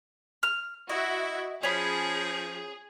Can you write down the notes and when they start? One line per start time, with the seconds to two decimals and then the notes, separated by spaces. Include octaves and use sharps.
0.43 F6
0.89 E4 F#4 D#5 E5
1.63 F3 C#4 G#4 B5